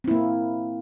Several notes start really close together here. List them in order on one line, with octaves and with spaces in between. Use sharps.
C4 E4 A#3